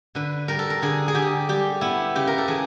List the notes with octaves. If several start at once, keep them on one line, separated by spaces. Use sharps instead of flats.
D3 B4
G3 A#4
A4
A#4
D3 G#4
G#4
D3 G4
G3 G4
B3 E4
C#3 G4
A#4
A4
E3 G#4